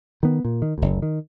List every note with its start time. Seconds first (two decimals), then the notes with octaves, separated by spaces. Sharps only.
0.23 D#3 B3
0.45 A#2
0.62 D#3
0.78 F#1 D2
1.02 D#3